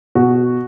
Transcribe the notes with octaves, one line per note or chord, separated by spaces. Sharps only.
B2 F#4